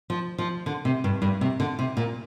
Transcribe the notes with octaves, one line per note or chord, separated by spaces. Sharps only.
F3
F3
D3
C3
G2
G2
C3
D3
C3
A#2